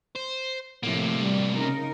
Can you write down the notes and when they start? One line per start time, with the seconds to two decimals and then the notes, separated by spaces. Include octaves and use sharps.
0.15 C5
0.83 A2 C3 F3 A#3
1.15 G3
1.56 C#3 D#4 A#4